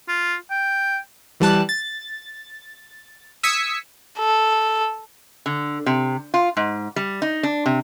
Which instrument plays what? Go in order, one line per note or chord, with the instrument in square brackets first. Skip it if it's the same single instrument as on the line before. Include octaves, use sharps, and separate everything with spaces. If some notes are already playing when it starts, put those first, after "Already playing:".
[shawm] F4
G5
[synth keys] E3 G3 A5 F#6
A6
D#6 E6 G#6 B6 C#7
[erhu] A4
[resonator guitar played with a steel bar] D3
C3
F4
G#2
G3
D#4
D4
C3